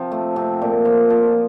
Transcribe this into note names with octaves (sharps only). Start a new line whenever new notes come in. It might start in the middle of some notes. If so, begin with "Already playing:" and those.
Already playing: C3 F3
A3
C3
A#2
F3
F3